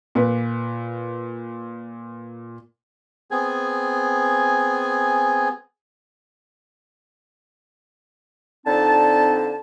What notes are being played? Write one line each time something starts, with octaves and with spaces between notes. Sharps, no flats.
A#2 B4
B3 C4 G#4 G#5
F2 D3 C4 D#4 D5 A5